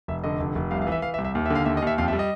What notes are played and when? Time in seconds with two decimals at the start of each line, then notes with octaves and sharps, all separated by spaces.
0.08 F1 E5
0.24 D3 D#5
0.40 F1
0.55 F1
0.71 C2 F5
0.82 F5
0.87 E3
0.92 E5
1.02 E3 F5
1.14 E5
1.18 C2
1.25 E5
1.35 D#2
1.46 E5
1.50 D3 F5
1.65 D#2 E5
1.77 D#5
1.82 D#2 E5
1.98 F2 F5
2.08 E5
2.13 G3
2.19 D#5